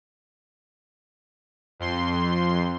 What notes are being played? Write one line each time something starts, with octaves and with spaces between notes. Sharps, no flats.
F2 C6